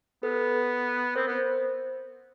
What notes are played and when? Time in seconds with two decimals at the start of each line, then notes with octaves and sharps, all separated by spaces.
0.23 B3 A4 B4
1.15 C4 A#4 C5
1.27 B3